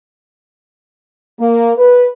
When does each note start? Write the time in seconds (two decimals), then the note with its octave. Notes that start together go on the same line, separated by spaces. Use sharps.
1.40 A#3
1.77 B4